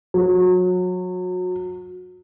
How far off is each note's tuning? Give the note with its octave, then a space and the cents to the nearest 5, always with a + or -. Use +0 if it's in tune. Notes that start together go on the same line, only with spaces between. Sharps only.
F#3 -25